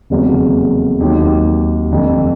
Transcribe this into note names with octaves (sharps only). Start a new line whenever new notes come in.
F1 E2 C#3 F#3 A#3
D#2 D#3 F#3
F1 F2 D3